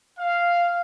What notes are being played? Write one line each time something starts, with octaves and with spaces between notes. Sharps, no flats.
F5